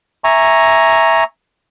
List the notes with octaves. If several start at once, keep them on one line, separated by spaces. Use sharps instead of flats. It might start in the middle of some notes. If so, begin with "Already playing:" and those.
E5 G#5 A#5 C#6